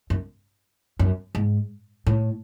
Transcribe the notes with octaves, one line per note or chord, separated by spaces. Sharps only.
F#2
F#2
G#2
A2